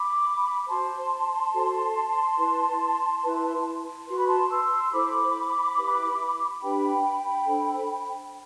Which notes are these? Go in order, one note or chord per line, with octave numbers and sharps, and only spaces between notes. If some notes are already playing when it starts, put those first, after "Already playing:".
Already playing: B5 D6
F#4 C5 A5 C6
F#4 A4 C5
E4 B4
E4 B4
F#4 B4 C6
B5
A5 C6
C6 E6
E4 A4 C5 B5 D6
E4 G4 B4
D4 G4 B4 G5 B5
D4 A4 C5